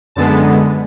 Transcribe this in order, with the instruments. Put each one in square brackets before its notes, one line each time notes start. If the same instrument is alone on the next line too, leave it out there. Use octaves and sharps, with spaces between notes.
[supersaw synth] F#2 D3 G#3 B3 A5